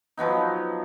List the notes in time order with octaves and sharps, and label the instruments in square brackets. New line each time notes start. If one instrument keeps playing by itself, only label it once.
[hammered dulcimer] F3 F#3 B3 D#4